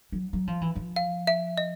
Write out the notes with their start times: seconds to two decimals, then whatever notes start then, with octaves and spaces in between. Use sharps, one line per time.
0.12 F#3
0.33 F#3
0.47 F3
0.61 E3
0.75 F3
0.96 F5
1.27 E5
1.58 D#5